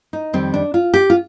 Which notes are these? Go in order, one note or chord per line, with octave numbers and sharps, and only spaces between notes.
D#4
F2 D#3 G3 C4
D4
F4
G4
F4